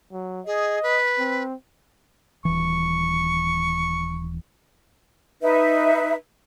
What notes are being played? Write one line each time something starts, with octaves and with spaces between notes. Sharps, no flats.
F#3
G#4 D#5
B4
C4
D#1 E3 C#6
D#4 B4 E5